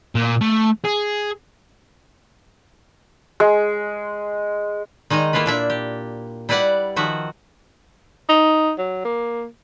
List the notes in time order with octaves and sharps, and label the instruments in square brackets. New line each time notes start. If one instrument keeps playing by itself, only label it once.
[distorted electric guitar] A#2
A3
G#4
[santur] G#3
[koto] D#3 G#3 D#4 D#5 A#5
A#3 E4 F4 A4 B4
A#2 D4 E5
G4
G3 E4 B4 D5 F#5
D#3 F3 F#4 E5
[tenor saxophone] D#4
F#3
A#3